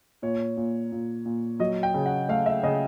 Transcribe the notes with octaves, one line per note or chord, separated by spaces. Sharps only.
A#2 C#5
A#2
A#2
A#2
F#3 D#5
G5
C#3
F#5
A3 F5
E5
C#3 D#5